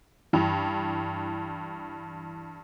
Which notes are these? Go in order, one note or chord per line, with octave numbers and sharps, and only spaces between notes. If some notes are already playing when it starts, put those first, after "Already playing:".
G2 E3